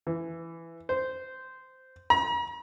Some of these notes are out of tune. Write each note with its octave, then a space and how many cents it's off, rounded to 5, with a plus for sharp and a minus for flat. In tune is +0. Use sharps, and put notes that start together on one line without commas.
E3 +15
C5 -10
A#5 +45